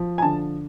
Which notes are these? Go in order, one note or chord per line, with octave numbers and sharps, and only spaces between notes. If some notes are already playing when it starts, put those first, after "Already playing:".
Already playing: F3
G#5
D3 A5